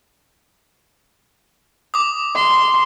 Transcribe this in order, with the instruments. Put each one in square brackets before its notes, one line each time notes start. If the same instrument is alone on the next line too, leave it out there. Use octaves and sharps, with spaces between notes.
[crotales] D6 D#6
[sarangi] C6